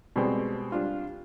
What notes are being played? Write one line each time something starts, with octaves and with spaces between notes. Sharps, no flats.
B2 G3 G#3 C4
G3 D4 F4